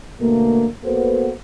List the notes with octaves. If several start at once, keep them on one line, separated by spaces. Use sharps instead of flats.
B2 D3 A3 A#3
A#3 B3 F#4 A4 B4 C5